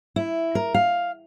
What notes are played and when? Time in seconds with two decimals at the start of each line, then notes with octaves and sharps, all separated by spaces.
0.16 E4
0.55 A#4
0.74 F5